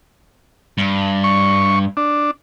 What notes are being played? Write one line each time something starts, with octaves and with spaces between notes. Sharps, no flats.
G2
C#6
D4